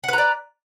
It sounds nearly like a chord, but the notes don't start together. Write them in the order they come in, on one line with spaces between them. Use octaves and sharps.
F#5 B4 A#5 D5